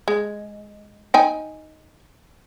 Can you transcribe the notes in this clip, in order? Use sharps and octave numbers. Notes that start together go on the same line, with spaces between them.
G#3
D#4 G5 G#5